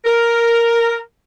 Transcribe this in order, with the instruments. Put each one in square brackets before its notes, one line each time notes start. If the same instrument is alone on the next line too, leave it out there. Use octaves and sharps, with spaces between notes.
[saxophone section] A#4